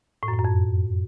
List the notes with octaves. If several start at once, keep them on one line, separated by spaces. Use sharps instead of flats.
A2
F#2
A2
F#2
F2